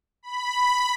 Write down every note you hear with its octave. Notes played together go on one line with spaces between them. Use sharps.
B5